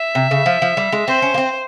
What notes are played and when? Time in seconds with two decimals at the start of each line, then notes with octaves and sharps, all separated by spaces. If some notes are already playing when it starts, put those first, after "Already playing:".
Already playing: E5
0.15 C3
0.31 C#3
0.46 F3
0.62 F3
0.77 G3
0.92 G#3
1.08 C4 C5
1.22 C#4
1.34 A#3
1.38 C4